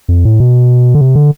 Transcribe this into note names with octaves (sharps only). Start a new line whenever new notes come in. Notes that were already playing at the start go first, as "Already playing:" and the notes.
F2
A2
B2
D3
C3
D3